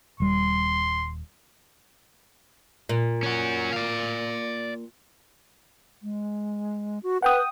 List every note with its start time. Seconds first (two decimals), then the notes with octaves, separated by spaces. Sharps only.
0.20 D#1 G3 C6
2.89 A#2
3.23 C#4 F#4
3.73 D5 F5
6.02 G#3
7.03 F#4
7.22 B4 F#5 G5 D#6